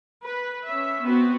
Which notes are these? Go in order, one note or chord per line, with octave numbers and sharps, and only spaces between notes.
B4
C#4 E5
B3 C4 F#4 B4